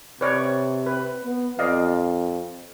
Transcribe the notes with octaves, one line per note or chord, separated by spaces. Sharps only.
C3 B4 C#5 D5
B4
B3
F2 D5 D#5 F5